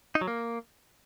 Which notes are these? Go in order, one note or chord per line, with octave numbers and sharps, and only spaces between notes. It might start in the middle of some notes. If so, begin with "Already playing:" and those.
D#4
F#3
A#3